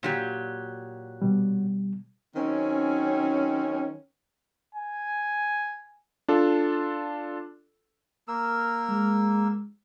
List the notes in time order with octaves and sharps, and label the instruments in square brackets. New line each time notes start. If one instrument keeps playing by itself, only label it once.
[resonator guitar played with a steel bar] A#2 F#3 G4
[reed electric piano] B2 G3
[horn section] D#3 F#3 C4 C#4
[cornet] G#5
[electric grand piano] D4 F4 A4
[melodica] A#3 A#4 E6
[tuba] G#3